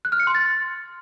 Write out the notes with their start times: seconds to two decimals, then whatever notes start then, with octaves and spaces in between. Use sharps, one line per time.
0.05 F#6
0.12 F6
0.20 C#7
0.27 C6
0.35 A6